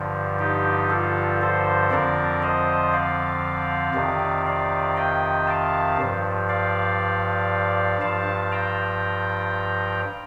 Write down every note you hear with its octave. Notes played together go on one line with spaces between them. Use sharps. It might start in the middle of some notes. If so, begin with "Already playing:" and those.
Already playing: G2 D3 F3
D#4 G4
F4 A4
A4 C5
F2 D3 F3 A#4 D5
C5 D#5
D5 F5
F2 C3 D#3
D5 F5
D#5 G5
F5 A5
G2 F3
D5 F5
G2 F3 F5 A5
G5 A#5